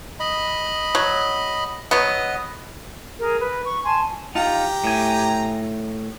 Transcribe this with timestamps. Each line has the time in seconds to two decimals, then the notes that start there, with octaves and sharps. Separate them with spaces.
0.20 D#5 B5
0.95 F#3
1.91 F#3 B3 D#5
3.20 G#4 A#4
3.40 B4
3.65 C#6
3.85 G#5 A5 C6
4.35 D#4 F4 G4 G5 A#5
4.84 A2 G#5